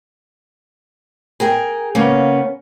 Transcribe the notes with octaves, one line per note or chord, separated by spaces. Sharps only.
G#4 A#4 G5
C#3 A#3 B3 C#4